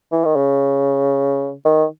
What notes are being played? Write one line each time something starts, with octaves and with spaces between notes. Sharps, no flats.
E3
D#3
C#3
D#3